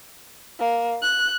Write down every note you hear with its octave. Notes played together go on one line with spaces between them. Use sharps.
A#3
F#6